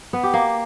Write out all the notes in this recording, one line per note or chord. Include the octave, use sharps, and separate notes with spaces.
B3
G4
A#3